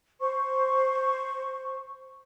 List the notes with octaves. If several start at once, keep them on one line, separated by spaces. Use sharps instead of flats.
C5 C#6